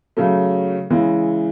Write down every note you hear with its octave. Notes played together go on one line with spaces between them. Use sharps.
C#3 F#3 A3
C#3 E3 G#3